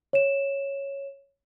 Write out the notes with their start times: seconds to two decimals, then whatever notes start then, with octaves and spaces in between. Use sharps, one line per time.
0.13 C#5 E7